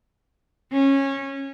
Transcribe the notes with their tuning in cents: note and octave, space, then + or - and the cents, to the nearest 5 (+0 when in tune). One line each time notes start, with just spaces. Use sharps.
C#4 -20